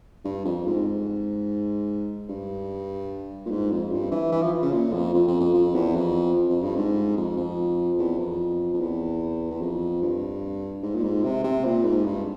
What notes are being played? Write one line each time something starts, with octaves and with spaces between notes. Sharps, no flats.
G2
F2
G#2
G2
A#2
G#2
F2
G2
E3
E3
F3
C#3
A#2
F2
F2
F2
F2
F2
E2
F2
F2
G2
G#2
F2
F2
E2
F2
F2
E2
E2
F2
G2
G#2
A#2
G#2
C3
C3
A#2
G#2
G2